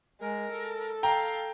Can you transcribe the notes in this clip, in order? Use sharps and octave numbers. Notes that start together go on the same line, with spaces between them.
G#3 A#4
A4
F5 G5 A#5